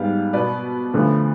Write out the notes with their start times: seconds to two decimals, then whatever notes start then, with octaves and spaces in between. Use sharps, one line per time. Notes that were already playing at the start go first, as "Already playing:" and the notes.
Already playing: G#2 G3 B3 F5
0.33 B2 B3 B4 D5
0.94 D2 D3 F3 B3